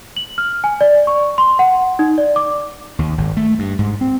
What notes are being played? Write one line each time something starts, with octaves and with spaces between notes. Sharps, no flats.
F#7
F6
G#5
D5
C#6
C6
F#5
D#4
D5
D6
D#2
G#1
A3
G2
G#2
C4